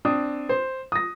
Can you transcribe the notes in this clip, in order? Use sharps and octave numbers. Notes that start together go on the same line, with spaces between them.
C4 D4 D#6
C5
D#6 A#6